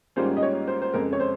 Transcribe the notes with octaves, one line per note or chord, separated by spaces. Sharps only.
G#2 G3 A#3 C#4 F4 C5
D#5
C#5
C5
C5
F2 C#3 G#3 A#4
C#5
C5